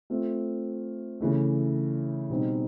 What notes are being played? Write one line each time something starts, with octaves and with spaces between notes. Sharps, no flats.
A3 C4 F4
C#3 E3 A3
B2 G3 C4 D#4